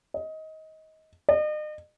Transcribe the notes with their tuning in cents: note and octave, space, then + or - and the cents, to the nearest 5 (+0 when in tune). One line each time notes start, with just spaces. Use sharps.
D#5 +20
D#5 -40